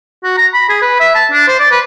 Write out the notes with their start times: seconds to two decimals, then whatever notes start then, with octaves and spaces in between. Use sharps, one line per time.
0.24 F#4
0.37 A#5
0.54 B5
0.69 G#4
0.82 B4
1.00 E5
1.15 A5
1.32 D4
1.48 C5
1.59 D5
1.71 B4